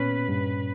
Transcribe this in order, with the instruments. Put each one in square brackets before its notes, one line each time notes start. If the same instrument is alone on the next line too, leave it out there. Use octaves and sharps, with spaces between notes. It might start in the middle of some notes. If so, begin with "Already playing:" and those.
Already playing: [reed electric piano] A#2 B3 C#4 [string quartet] B4
[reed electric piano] G2